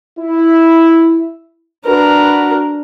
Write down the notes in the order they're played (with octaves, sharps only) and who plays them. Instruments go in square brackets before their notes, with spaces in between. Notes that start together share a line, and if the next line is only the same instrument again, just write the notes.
[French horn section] E4
[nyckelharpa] D4 A#4 [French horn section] F#4 B4